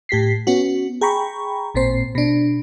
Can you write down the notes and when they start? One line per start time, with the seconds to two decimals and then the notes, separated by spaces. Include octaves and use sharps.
0.09 A2 G4 B6 C7
0.47 B3 C#4 F#4
1.01 G#4 G5 A#5 B5 C#6
1.75 A1 A#2 C4 C5 C7
2.15 B2 D4